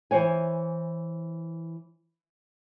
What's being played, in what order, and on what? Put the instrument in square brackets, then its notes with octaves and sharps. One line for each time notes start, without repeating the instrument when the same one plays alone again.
[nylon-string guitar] E3 C5 C#5 G#5